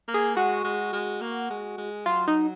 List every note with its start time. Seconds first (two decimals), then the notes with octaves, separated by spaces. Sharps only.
0.08 A#3
0.14 G#4
0.36 G#3 F#4
0.64 G#3
0.93 G#3
1.21 A#3
1.50 G#3
1.78 G#3
2.06 F#3 F4
2.28 D#4